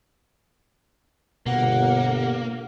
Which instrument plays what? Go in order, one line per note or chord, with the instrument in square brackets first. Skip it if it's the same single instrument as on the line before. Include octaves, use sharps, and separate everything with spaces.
[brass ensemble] G1 [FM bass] B2 [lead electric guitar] A#3 [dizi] F#5